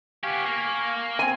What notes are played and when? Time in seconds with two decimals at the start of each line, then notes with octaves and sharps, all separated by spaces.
0.23 B3 G4 F5 G#5 C#6
0.46 A#3
1.19 C4 G#5